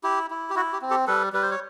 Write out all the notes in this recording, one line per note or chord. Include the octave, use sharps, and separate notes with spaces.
E4 G4
E4
G4
E4 F#4
G4
C4
G4 A4
G3 A4 B4
G3 B4
C5
C#5